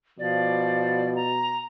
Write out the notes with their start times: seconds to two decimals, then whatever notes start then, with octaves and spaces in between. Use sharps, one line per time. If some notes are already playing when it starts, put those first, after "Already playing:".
0.19 B2 F3 D5
1.16 A#5